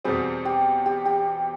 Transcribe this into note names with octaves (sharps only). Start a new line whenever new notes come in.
E2 B2 G3 C4 G#4
G4
G4
G4